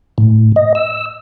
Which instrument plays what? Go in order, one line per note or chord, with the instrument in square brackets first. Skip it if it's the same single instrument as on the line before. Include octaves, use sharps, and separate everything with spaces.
[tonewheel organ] A2
D#5
E6